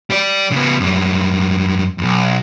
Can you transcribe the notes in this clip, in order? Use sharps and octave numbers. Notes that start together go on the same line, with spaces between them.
G3 D5
C#3 B3
F#2 G3
B1 F2